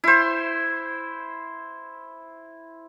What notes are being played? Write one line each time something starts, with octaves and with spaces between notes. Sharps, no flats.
E4 C5